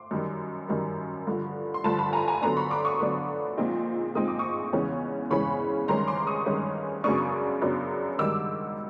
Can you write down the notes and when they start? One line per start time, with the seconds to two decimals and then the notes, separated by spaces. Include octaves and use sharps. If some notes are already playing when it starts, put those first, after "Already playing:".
Already playing: C6 D6
0.11 F#2 D#3 G3
0.69 F#2 D#3 G3
1.27 G2 D3 F3
1.74 C6
1.84 G2 D3 F3 A5 B5
1.99 A5 B5
2.13 G#5 A#5
2.28 G#5 A#5
2.42 D3 F#3 B3 D4 A#5 C6
2.57 B5 C#6
2.70 C6 D6
2.85 C#6 D#6
3.00 D3 F#3 B3 D4
3.57 A#2 F3 G#3 C4 D#4
4.15 A#2 F3 G#3 C4 D#4 D#6
4.28 D6
4.39 C#6 D#6
4.73 E2 C#3 E3 G#3 C#4
5.30 E2 C#3 E3 G#3 C#4 B5 C#6
5.88 G2 D#3 G#3 C#4 A#5 C6
6.07 C6 D6
6.27 C#6 D#6
6.46 G2 D#3 G#3 C#4
7.04 F#2 C#3 F#3 B3 D4 C#6 D#6
7.61 F#2 C#3 F#3 B3 D4
8.19 G#2 D#3 G3 D6 E6